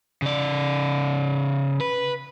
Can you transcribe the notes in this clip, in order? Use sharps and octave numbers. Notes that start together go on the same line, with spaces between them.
C#3 D5
B4